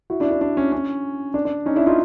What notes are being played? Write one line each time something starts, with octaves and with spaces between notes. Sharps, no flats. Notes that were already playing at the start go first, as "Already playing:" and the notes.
E4 F#4
D4 E4
D4
D4
C#4
C#4
D4
D4
C#4 D#4
D4 E4
D#4 F4